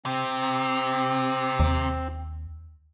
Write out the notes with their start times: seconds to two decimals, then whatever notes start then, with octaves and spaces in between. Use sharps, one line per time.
0.06 C3 C4
1.60 D#2